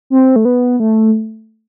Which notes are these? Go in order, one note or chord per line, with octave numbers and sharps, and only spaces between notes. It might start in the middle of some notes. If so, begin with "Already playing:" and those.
C4
A3
B3
A3